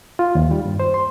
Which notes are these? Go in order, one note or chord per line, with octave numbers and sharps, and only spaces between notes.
F4
D#2
G3
G2
C5
C6